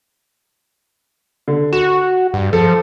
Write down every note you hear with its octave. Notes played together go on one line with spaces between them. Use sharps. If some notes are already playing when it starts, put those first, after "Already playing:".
D3
F#4 E7
G2
F3 A4